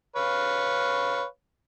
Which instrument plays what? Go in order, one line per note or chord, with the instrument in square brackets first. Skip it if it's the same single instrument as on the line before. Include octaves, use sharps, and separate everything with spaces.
[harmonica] B4 C#5 F5